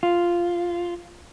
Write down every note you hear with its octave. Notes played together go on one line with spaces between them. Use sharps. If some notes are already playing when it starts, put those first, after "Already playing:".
F4